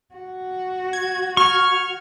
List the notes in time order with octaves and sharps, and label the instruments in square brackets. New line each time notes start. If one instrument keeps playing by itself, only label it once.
[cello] F#4
[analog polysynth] G#6
[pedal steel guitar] C#6 [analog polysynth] F6 G#6